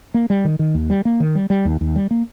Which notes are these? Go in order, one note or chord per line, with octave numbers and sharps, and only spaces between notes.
A#3
G3
D#3
D#3
D#2
G3
A#3
D#3
G3
G3
D#2
D#2
G3
A#3